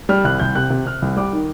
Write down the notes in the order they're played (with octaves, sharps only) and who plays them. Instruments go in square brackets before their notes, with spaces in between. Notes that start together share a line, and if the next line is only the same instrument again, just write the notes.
[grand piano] G3 F6
C2 F#6
C2 G6
C3 F#6
C3
C3 F6
C2
G3 D6
D#3